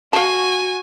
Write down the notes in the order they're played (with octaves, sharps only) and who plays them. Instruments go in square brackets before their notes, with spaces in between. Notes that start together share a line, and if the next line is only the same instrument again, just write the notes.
[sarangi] F#4 [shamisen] F5 A5 [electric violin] G#5